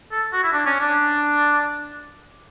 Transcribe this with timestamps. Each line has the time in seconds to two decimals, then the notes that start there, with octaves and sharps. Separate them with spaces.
0.12 A4
0.33 F#4
0.43 E4
0.53 D4
0.66 C#4
0.80 D4